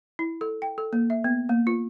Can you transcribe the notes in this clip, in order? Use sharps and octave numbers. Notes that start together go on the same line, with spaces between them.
E4
A4
G5
A4
A#3
E5
B3
A#3
F4